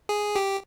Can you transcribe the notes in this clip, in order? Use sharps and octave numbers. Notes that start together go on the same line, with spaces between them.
G#4
G4